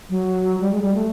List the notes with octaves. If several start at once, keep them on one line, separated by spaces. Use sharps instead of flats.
F#3
G3
G#3
G3
A3